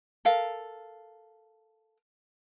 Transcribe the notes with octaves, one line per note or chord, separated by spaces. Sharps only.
A4 A#4 F5